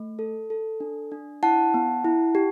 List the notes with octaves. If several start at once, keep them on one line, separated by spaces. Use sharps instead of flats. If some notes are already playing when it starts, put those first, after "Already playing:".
Already playing: A3
A4
A4
D4
D4
E4 F#5 A5
B3
E4
G4